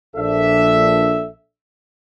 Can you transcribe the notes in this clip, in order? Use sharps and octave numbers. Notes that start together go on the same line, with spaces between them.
A#1 D4 A4 E5